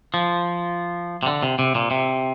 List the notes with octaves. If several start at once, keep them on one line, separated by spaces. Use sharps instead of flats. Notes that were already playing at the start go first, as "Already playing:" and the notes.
F3
C3
D3
C3
C3
A#2
C3